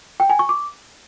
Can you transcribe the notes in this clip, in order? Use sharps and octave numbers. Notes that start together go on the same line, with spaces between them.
G5
G#5
C#6
D6